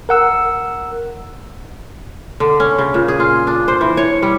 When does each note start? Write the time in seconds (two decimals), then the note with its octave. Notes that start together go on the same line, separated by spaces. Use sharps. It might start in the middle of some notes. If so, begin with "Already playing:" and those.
0.09 A#4 F#5 E6
2.40 D3
2.60 C#4
2.79 C#3
2.94 A#2
3.08 G#4
3.20 F4
3.47 D4
3.68 C5
3.81 E3
3.97 C#5
4.23 G3